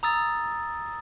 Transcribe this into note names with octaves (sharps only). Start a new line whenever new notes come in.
A#5 D#6 E6 A6